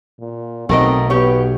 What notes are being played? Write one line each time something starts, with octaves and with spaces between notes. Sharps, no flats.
A#2
B1 B2 A3 C4 A#4 D#5
B3 G4 C#5